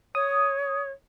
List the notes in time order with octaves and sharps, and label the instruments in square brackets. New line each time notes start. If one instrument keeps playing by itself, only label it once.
[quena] C#5 [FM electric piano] D#6